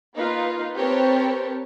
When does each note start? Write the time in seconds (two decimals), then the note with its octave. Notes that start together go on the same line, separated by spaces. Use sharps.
0.16 A#3 D#4 F4 B4
0.76 C4 G4 A#4 B4 C#5 A5